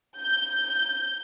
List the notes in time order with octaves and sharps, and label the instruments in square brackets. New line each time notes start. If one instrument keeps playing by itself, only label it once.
[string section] G6